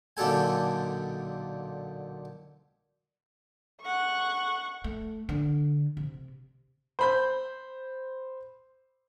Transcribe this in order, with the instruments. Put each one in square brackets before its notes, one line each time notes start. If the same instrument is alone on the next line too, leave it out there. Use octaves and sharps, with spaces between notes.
[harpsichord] B1 A#2 D3 G4 A4 G#5
[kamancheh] F#5 C#6
[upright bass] A3
D3
C3
[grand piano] C5 B5 G6